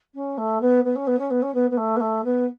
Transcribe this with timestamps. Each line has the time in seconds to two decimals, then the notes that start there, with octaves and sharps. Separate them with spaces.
0.14 C#4
0.37 A3
0.61 B3
0.84 B3
0.95 C#4
1.07 B3
1.18 C#4
1.30 B3
1.42 C#4
1.54 B3
1.70 B3
1.77 A3
1.96 B3
2.00 A3
2.24 B3